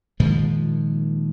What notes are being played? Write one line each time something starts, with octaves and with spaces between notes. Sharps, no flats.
A#2 D#3 F3 G#3